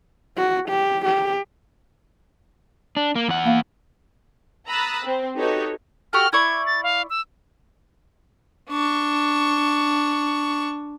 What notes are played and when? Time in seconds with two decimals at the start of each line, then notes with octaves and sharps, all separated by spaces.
0.37 F#4
0.69 G4
1.05 G4
2.97 D4
3.16 A#3
3.28 E2 F#5
3.45 A#3 F5
4.67 A#5 B5 D#6 E6 F#6 A6
5.04 C4
5.38 D#4 F#4 G4 A4 B4 C#5
6.13 F#4 G4 A4 F6
6.33 E4 D5 C#6 G#6
6.66 A6
6.83 F5
7.10 E6
8.70 D4 C#6